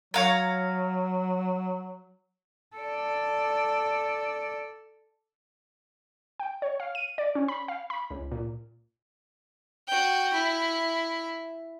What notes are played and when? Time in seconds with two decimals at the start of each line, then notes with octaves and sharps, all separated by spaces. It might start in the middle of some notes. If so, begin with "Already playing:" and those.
0.14 F#3 C#5 F5 A#5
2.76 A4 D5
6.40 G5
6.62 C#5
6.80 F5
6.95 D#7
7.18 D5
7.35 C#4
7.48 B5
7.68 F5
7.90 B5
8.11 C#2
8.31 A#2
9.87 F#4 G5
10.33 E4